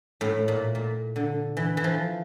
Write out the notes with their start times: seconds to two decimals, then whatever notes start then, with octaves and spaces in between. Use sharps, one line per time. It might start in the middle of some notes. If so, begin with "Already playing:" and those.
0.21 A2
0.48 A#2
0.75 A#2
1.16 D3
1.57 E3
1.77 E3
1.84 F3